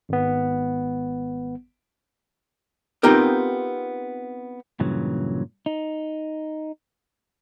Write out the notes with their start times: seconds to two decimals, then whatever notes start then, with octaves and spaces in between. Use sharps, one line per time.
0.09 G#1 B3
3.03 B3 C4 D#4 F4 G4 A#4
4.80 G2 A#2 C#3 E3 F#3
5.66 D#4